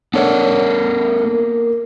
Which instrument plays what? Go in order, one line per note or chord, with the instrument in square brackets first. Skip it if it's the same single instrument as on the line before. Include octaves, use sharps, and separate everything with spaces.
[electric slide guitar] B3 A4 A#4 [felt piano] D4 C#5 F#5
[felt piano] A#3